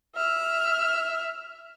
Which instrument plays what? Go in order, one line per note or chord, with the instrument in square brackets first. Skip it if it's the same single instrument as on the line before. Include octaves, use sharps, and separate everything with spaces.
[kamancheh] E5 F6